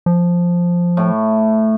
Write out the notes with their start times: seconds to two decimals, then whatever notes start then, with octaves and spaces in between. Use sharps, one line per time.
0.06 F3
0.97 A2 A3